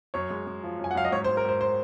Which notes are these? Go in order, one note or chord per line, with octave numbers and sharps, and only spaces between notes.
F#2 C#5
G#3
G#3
F3
F#2 G#5
F#5
F#2 F5
D#5
G#2 C#5
C5
G#2
A#4
G#2 C5
C5